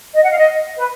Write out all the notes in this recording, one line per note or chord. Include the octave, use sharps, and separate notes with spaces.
D#5
F#5
F5
D#5
B4